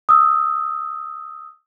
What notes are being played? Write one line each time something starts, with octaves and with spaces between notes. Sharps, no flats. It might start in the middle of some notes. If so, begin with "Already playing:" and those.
D#6 E6